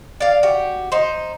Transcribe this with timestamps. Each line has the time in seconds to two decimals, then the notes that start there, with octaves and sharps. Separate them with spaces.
0.20 D5 F5
0.43 F#4 G4
0.92 D#4 C5